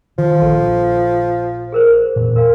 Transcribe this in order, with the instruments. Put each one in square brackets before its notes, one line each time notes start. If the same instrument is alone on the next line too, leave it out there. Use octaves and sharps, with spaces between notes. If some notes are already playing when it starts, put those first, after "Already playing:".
[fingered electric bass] D#3 [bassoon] F3
[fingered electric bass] A#1 [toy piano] A4
[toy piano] G#4 A#4 C5
[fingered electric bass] E1 A#2
[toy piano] A#4 F5